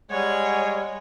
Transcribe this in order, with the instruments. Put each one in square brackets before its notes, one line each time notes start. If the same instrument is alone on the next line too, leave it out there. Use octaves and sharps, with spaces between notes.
[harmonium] G3 [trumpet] G#3 [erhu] C#5 [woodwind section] F#5 G#5